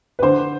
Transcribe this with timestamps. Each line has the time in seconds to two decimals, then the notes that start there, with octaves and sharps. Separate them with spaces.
0.19 B4
0.22 D3 C5